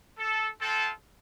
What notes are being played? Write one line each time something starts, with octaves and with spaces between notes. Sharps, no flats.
A4
C4 F4 A4